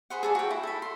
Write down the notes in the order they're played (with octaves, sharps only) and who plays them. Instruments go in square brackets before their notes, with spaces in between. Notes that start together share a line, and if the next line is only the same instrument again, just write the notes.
[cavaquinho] G#4 B4 C5 F#5
G#4 A4 D5
F#4 G5
E4
A4 B5
C6